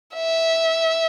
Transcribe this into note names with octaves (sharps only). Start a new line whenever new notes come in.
E5